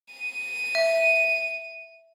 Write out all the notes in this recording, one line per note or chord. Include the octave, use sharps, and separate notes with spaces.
D#7
E5